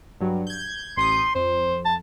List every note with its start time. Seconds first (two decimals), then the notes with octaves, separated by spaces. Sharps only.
0.21 G2 F#3
0.47 G6 G#6
0.97 A1 C6 D#6 G6
1.35 F2 C5
1.85 A5